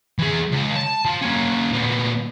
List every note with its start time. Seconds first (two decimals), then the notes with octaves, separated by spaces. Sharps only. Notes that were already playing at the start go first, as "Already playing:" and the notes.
0.19 E3 G#4
0.51 C#2
0.76 A5
1.05 F3
1.22 A#3 C#4
1.72 A#2 B3